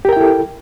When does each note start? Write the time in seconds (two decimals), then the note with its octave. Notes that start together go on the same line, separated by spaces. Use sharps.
0.05 G4
0.09 A#4
0.13 G5
0.17 E4
0.20 A4